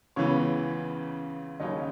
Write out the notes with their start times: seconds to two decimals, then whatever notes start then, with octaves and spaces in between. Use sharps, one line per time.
0.16 C#2 C#3 E3 B3 C#5
1.60 D#2 C#3 F#3 C#4 D#5